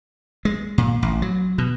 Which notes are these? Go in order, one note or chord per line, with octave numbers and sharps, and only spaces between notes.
G#3
A#2
A1
F#3
B2